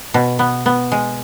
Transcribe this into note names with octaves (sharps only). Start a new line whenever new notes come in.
B2
B3
B3
G#3